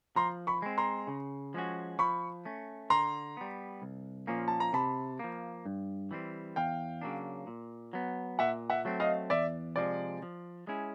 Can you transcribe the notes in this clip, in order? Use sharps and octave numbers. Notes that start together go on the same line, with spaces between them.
F3 A#5 C6
B5 C#6
G#3 C4
A#5 C6
C#3
F3 G#3 C#4 F#4
F3 B5 C#6
A3 C#4
D3 A#5 C6
G3 B3
C2
A#2 F3 A#3 C#4
A5
A#5
C3 A5 B5
F3 A#3
G2
E3 G3 C4
E2 F5 G5
C#3 F#3 A#3 D4
A#2
F#3 B3
A#2 E5 F#5
E5 F#5
F#3 A3 C4
D#5 F5
E2 D5 E5
C3 F3 G#3 D5
F3
G#3 C#4 E4 G#4